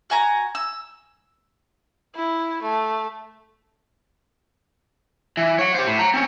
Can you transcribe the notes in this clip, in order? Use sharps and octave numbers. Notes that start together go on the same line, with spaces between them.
F#4 G#5 A#5
E6
E4
A3
E3
C#5 F#5
G4 C5
A2
F#5 A#5
C4 C#4